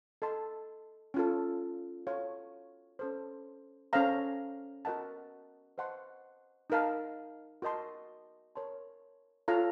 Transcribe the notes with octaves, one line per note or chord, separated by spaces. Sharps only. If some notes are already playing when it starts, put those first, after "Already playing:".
A4 D#5 A5 C6
C#4 F4 A4
F#4 A4 C#5 F5 C6
C#4 A4 C5
C#4 A4 C5 F5 A#5
F#4 A#4 D#5 F#5 A5
C5 D#5 F#5 A5 C6
D#4 A#4 F5 A5
F#4 A#4 D#5 A5 C6
A#4 C#5 A5 C6
F4 A4 C#5 F5 A#5